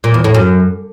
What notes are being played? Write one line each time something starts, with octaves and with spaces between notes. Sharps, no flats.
A#2
E2
A2
F#2